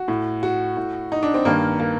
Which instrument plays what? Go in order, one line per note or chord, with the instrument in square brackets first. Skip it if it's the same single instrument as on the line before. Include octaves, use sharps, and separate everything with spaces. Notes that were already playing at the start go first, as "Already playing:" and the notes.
Already playing: [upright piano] F#4
A2
F#4
A2
D#4
D4
C4
G2 D#3 A#3
A#3